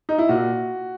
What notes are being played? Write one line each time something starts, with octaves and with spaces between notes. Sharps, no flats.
D#4
E4
A#2 F#4